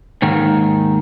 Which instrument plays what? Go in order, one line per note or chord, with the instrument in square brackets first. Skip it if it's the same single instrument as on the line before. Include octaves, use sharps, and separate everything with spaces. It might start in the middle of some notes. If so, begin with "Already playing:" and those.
[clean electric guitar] D#2 G#2 D#3